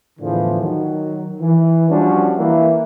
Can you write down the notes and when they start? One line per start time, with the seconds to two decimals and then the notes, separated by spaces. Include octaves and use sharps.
0.20 E2 A2 D3 E3 F3
0.60 D#3 F#3
1.40 E3
1.88 F3 G3 C#4 D4 F#4
2.36 E3 A#3 E4